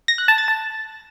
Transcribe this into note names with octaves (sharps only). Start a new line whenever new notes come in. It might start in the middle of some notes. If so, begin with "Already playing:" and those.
A#6
F#6
A5
A6
A5